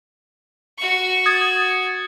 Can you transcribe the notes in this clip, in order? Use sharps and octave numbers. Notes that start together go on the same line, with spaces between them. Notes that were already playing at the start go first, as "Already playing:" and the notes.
F#4 C#6
D#6 G#6 A6